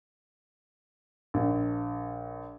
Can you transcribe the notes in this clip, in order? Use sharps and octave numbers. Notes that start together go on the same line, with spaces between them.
A#1